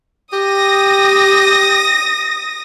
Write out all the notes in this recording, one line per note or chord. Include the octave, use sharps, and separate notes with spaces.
G4 D#6 A#6